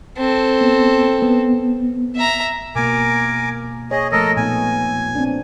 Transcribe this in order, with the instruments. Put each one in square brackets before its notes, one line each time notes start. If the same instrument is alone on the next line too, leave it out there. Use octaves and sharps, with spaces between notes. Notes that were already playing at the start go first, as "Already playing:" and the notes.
[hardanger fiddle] C4 A4
[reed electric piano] B3
B3
[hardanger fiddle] E5 A#5
[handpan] B2 A#3 [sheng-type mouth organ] A#4 G#5 D6
[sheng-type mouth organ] G#4 D#5 [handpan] C#5
[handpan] F3 A3 [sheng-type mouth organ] A4 A#4 D#5
[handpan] A#2 B3 D#4 [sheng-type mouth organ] G#5
[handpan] C4 D4